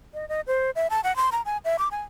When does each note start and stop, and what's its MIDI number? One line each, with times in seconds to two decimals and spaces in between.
0.14 0.28 75
0.29 0.41 75
0.47 0.71 72
0.76 0.87 76
0.90 1.01 81
1.04 1.15 78
1.16 1.30 84
1.32 1.42 82
1.45 1.58 80
1.65 1.76 76
1.79 1.89 86
1.91 2.01 80